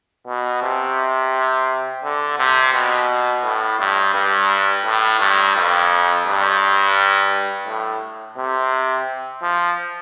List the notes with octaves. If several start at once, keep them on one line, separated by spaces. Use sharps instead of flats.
B2
C3
D3
C3
B2
A2
G2
G2
A2
G2
F2
G2
A2
C3
F3